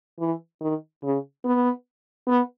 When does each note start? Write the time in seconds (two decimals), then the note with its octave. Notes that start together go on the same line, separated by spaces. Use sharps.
0.20 E3
0.61 D#3
1.03 C#3
1.45 B3
2.28 B3